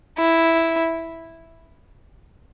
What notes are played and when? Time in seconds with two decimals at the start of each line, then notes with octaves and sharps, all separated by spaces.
0.18 E4